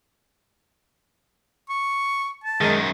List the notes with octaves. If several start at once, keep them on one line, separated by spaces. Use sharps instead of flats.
C#6
A5
F#2 D#3 G#3 A#4 D#5